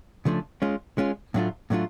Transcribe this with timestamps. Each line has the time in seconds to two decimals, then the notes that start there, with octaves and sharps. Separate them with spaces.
0.25 C#3 F3 A3 D4
0.62 G#3 C#4 F4
0.98 G#3 C#4 F4
1.34 A2 F#3 A3 D4 F4
1.70 A2 F#3 A3 D4 F4